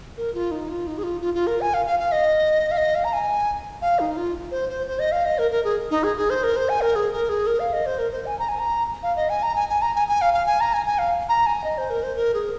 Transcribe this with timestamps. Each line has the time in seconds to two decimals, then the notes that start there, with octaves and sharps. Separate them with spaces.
0.17 A#4
0.34 F4
0.51 D#4
0.69 F4
0.87 D#4
0.98 G#4
1.03 F4
1.21 F4
1.34 F4
1.47 A#4
1.61 G#5
1.74 F5
1.86 F5
1.99 F5
2.12 D#5
2.71 F5
2.77 D#5
2.95 F5
3.04 A#5
3.13 G#5
3.82 F5
3.99 D#4
4.17 F4
4.51 C5
4.69 C5
4.87 C5
4.99 D#5
5.12 F5
5.25 D#5
5.38 A#4
5.51 A#4
5.64 G#4
5.91 D#4
6.04 G#4
6.17 G#4
6.30 C5
6.43 A#4
6.56 C5
6.69 G#5
6.81 A#4
6.95 G#4
7.13 A#4
7.29 G#4
7.47 A#4
7.60 F5
7.73 D#5
7.86 C5
7.99 A#4
8.12 C5
8.26 G#5
8.39 A#5
8.49 G#5
8.59 A#5
9.03 F5
9.16 D#5
9.29 G#5
9.43 A#5
9.56 G#5
9.69 G#5
9.82 A#5
9.95 G#5
10.08 G#5
10.22 F5
10.34 F5
10.46 G#5
10.61 A#5
10.73 G#5
10.86 G#5
10.99 F5
11.29 A#5
11.46 G#5
11.64 D#5
11.78 C5
11.90 A#4
12.03 C5
12.16 A#4
12.34 G#4